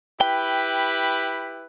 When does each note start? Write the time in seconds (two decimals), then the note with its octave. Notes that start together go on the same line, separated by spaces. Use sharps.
0.21 E4 G4 B4 G5